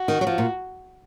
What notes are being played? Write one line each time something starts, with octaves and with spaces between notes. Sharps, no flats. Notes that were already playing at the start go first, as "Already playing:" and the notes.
Already playing: F#4
D#3
F#3
F3
A#2